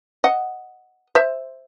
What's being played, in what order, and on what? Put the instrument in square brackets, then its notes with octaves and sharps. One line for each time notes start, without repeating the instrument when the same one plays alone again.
[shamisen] D#5 F#5
C5 E5